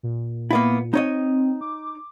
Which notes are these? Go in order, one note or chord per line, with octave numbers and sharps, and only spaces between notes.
A#2
A#3 B3 E4
C4 D#4 C#5 D#5
D6